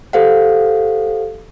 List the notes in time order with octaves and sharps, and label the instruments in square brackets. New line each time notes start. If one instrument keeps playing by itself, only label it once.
[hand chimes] G4 A4 C5 F5 F#5